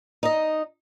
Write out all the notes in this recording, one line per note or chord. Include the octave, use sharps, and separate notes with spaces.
D#4 D#5